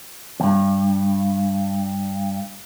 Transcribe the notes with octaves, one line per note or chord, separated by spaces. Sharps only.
E2 G2